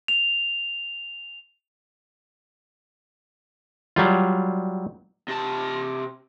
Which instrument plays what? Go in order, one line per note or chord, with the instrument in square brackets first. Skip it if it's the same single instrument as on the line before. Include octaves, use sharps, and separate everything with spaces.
[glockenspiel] F7
[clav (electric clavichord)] F#3 G3 F4
[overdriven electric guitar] C3 A5